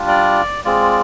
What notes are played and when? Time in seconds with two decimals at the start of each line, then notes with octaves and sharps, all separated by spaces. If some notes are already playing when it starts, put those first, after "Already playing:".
Already playing: G3 D4 F4
0.08 D5
0.64 G#3 C4 F4 D5